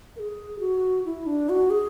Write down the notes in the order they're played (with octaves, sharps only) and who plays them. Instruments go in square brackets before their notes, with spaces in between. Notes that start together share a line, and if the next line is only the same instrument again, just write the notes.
[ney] A#4
G#4
F#4
E4
D4
F#4
G#4